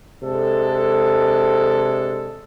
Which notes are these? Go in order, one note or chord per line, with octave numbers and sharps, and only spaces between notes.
C3 G#3 D4 A4